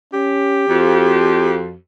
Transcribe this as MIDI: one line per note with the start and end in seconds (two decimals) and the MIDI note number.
0.13 0.65 61
0.13 1.56 67
0.69 1.73 41
0.69 1.77 66